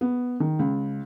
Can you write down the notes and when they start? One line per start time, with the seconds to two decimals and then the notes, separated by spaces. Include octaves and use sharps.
0.01 B3
0.40 D#3
0.59 C#2